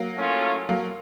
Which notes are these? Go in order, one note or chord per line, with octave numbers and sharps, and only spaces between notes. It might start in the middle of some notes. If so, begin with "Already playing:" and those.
Already playing: F#3 A#3
A2 A3 C#4 F4
F#3 A#3